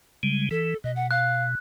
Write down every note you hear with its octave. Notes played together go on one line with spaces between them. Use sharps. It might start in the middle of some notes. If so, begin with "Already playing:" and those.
C#3 G3 G#3
E3 A4
B2 D#5
F#5
F5 F#6